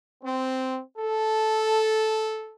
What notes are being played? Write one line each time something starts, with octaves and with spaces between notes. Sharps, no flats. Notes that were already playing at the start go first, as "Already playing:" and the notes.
C4
A4